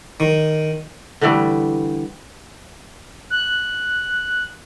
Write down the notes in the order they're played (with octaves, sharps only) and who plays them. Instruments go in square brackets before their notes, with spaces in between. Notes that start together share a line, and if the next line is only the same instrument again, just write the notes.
[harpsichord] D#3
[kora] D3 E3 G3 A3
[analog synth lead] F#6